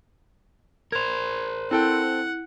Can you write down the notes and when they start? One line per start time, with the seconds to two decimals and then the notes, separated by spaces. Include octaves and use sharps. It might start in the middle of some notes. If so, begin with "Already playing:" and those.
0.92 A#4 C5 G#6 F7
1.71 C4 E4 A4 F#5 G5